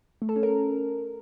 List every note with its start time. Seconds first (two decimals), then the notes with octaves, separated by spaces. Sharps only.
0.22 A3
0.29 A4
0.36 C#4
0.43 A#4